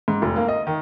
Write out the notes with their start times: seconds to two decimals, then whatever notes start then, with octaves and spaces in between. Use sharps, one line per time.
0.08 G#2
0.22 F1
0.36 A#3
0.48 D#5
0.67 D#3